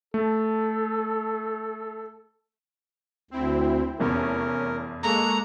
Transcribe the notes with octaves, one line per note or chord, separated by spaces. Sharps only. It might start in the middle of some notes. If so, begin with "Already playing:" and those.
A3 A4
D2 C4 E4
F1 E2 C#4 A#4
G#3 A#3 A4 A#5 C#6 F#6